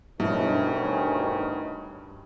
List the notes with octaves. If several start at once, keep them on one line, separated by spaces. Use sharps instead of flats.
D2 G2 B2 D#3 C#4 D4 E4 G4